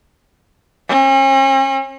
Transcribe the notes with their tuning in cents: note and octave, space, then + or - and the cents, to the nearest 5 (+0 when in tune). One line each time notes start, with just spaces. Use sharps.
C#4 -45